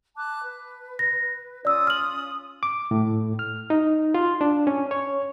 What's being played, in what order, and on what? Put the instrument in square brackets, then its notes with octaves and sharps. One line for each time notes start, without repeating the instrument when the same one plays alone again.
[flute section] A5 D6 F#6
B4
[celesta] A#6
[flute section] C#4 F4 D#6 [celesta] D5 E6
[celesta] F6 F#7
[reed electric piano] D6
A2
F6
D#4
F4
D4
C#4
C#5